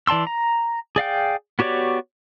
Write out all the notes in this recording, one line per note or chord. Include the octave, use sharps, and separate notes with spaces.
E3 D5 A5 C6 E6
A#5
G#4 D5 F5 G5
B3 F#4 G4 C#5 D5